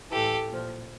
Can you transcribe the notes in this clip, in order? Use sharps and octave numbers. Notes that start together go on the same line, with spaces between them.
A2 E3 G4 A4
A#2 F3